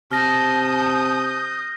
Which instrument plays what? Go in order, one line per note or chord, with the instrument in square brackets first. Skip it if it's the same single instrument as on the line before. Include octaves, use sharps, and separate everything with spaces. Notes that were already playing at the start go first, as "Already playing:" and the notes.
[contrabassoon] C3 [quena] A5 [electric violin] D#6 G6 [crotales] F6 A#6